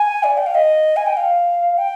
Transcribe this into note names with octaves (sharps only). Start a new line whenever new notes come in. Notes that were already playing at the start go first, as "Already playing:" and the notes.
Already playing: G#5
D5
G5
F5
D#5
G#5
G5
F5
G5